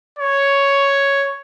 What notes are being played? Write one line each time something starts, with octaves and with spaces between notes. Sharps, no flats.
C#5